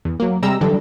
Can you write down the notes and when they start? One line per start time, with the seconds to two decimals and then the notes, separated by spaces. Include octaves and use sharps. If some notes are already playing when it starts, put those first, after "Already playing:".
0.05 E2
0.20 F#3 A#3
0.43 C3 G3 G#3 A#5 E6
0.61 D3 E3 F#3 G3 D4 A4